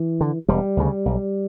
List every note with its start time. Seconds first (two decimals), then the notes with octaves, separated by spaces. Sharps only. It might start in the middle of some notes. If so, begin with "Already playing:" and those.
Already playing: E3
0.21 D3
0.48 E1 G3
0.77 D2 C#3
1.06 B1